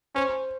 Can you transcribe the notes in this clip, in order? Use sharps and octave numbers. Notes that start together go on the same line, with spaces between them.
C#4 C5